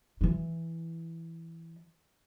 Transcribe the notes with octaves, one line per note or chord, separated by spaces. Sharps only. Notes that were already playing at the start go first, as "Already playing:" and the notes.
E3 E4